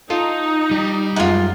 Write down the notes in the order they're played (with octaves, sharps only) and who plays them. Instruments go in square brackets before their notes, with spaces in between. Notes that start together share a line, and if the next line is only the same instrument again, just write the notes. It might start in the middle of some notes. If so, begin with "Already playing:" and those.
[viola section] D#4 [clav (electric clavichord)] F4 A4
[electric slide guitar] G3
[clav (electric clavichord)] F#2 G#3 F#5 [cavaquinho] D#4 F4